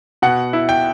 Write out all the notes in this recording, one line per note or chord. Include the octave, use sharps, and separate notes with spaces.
B2 F#5
E4
G5